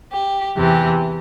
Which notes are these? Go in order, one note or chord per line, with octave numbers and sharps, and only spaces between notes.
G4
E2 C3 E3 G4